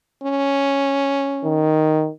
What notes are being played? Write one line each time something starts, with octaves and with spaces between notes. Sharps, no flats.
C#4
D#3